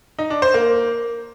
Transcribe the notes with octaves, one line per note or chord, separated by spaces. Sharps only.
D#4
D4
C5
A#3